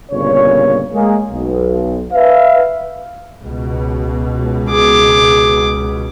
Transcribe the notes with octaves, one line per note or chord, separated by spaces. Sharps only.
G1 A#2 C#3 C#5
G#3 A#3 G#4
B1
B4 E5 F5
C#2 B2
G#4 D6